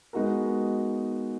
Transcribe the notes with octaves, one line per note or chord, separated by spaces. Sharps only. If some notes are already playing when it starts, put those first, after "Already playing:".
G#3 B3 D#4 F#4 A#4